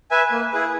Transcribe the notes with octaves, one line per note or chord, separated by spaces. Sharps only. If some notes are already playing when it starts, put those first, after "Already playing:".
B4 E5 G#5
A#3
E4 G#4 B4